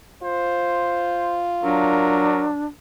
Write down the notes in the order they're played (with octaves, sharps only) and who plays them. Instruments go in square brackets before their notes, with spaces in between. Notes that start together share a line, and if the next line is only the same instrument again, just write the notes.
[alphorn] F4 [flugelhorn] C5
[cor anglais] F#3 [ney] D4 [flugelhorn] A#4